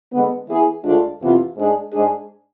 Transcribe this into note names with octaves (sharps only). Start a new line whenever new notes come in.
D3 G#3 B3
E3 B3 E4 G#4
D2 D3 G#3 D4 F4
F2 C3 E3 B3 F4
G#2 G#3 D4 G#4
G#2 G#3 D4 G#4